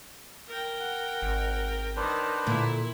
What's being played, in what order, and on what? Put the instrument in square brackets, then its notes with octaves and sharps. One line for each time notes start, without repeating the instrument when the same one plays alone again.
[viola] A#4 G5
[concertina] F#5
[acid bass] G#1
[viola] D#3 [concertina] D4 B4 C5
[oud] A#2 [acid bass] D3 [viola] E4